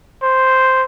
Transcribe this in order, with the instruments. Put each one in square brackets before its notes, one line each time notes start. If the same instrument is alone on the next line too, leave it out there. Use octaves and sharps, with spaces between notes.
[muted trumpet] C5